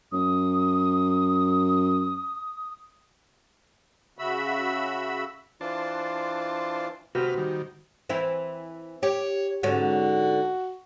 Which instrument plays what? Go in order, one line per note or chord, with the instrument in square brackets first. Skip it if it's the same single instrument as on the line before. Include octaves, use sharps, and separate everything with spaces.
[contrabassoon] F#2 [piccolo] D#6
[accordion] C#3 F#4 E5 B5 E6
[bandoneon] E3 F4 [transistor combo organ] D4 C5 A5
[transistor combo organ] C3 B4 F6 [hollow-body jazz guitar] F#4 G4 C5
[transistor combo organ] D#3 G3
[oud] E3 C4 E4
[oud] G4 [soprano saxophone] C#5
[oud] G#2 D3 C#4 [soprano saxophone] F#4